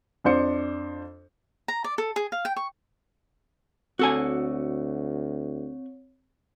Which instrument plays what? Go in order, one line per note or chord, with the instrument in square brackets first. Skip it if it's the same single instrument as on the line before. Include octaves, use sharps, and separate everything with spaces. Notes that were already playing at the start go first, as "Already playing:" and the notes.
[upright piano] F2 D4 C5 C#7
[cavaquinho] A#5
D5
A4
G#4
F5
G5
C#6
[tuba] D2 [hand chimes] C4 C#5 [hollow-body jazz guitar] F#4 A4 G#5